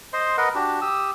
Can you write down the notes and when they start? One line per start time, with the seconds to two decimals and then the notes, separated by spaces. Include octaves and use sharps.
0.13 C5 D#5 C6
0.38 A#4 B4 D#5 F#5
0.55 D4 F#4 G4
0.81 G4 D#6 E6